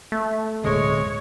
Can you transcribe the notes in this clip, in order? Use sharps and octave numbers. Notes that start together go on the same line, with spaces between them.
A3
D1 B2 G#3 C#5